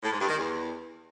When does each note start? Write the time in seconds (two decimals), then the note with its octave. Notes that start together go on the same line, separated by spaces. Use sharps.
0.03 A2
0.11 G#2
0.20 G2
0.28 D#3
0.37 E2